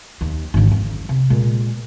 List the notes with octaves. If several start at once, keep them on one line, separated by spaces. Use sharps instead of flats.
D#2 A#3
G#1 D3
F2
C3
A#2 G#3